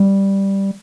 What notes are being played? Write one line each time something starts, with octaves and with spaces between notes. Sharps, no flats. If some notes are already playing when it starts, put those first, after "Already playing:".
Already playing: G3